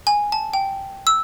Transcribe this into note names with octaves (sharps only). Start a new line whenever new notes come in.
G#5
A5
G5
E6